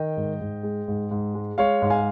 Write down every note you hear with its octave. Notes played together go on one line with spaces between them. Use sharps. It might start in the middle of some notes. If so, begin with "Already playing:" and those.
Already playing: D#3 D#5 G5
G#2
G#2
G#3
G#2
G#2
G#3
G#3 C#5 F5
G#2
F5 G#5